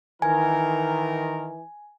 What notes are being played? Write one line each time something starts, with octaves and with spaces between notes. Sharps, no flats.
D#3 E3 A#4 G#5